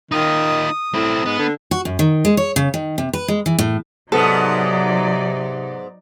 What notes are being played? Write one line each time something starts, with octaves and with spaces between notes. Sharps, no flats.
D#3 D#4 F4 D#6
A2 C4 E4
G#2 B3
D3
F#4
F#2
D#3
G#3
C#5
C#3
D#3
C3
B4
G#3
E3
A2
G#2 C3 F#3 B3 D#4 A4 D5